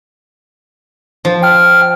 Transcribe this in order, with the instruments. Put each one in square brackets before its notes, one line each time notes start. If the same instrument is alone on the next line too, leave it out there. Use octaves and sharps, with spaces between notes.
[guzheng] F3
[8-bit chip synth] G5 F6